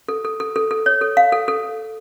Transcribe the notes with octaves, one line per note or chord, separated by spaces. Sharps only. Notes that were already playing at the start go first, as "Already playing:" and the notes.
A4
A4
A4
A4
A4
C#5
A4
F5
A4
A4